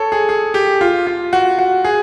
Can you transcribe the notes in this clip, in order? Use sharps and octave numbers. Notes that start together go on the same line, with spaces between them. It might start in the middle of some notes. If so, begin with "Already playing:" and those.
Already playing: A4 C#5
G#4
G#4
G4
F4
F4
F#4
F#4
G#4